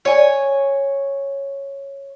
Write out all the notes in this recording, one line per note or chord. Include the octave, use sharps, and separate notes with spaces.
C#5 G#5